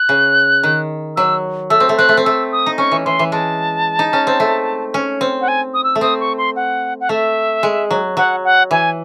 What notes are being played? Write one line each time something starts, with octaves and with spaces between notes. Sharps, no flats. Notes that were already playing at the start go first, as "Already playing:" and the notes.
Already playing: F#6
C#3
D#3
F#3 E6
A3 E6
C4
A3
C4 F#6
A3
C4
A3 E6
D#6
D#4
C#4 C#6
E3
E3 C6
E3
G#3 A5
D#4
C#4
C4
A3
C#4
C4
F#5
G#5
D#6
E6
A3
C4 D#6
C#6
C6
F#5
F#5
A3 E5
G#3
F#3
F#3 F#5
F#5
E3 G#5